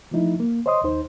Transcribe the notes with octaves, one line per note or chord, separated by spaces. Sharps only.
E3 F3 A3 D#4 E4
A#3
C5 C#5 D#5 C6 D#6
D#2 D#4 C5